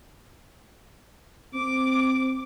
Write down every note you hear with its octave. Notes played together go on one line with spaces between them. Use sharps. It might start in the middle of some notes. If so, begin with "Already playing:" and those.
C4 D6